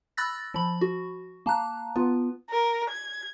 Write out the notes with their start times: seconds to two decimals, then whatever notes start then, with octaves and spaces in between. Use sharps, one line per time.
0.17 B5 E6 F#6 A6 A#6
0.54 F3 B5
0.81 F#4
1.46 A#3 A5 A#5 F#6
1.96 B3 F4 B4
2.51 A#4
2.90 G#6